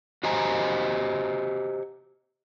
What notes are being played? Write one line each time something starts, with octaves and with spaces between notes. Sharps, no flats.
F#4 G4 C5 D#5 G#5 A#5